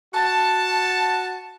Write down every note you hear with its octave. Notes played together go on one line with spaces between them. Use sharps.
F#4 A5